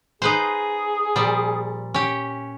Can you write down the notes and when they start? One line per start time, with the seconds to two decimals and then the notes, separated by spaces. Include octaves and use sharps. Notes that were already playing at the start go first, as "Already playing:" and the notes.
0.22 D#4 G#4 B4 C5
1.16 A#2 F3 G3
1.94 C#4 G4